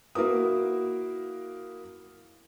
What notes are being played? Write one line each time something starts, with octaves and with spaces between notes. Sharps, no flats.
A#3 E4 F#4 A#4 D#6